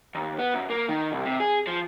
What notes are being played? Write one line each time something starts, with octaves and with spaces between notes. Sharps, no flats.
D#2
B3
F#2
A#3
D#3
C2
C3
G#4
F3